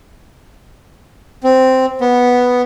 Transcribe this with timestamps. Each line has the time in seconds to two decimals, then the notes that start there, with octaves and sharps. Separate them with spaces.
1.44 C4
2.01 B3